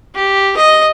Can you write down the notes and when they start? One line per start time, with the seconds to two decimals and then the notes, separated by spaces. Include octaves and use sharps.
0.15 G4
0.57 D#5